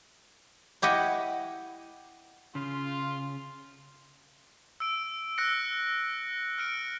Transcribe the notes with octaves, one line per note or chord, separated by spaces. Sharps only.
E4 G4 D#5 F#5
C#3 F4
E6 D7
E6 F#6 A#6 C#7
F6 C#7 D7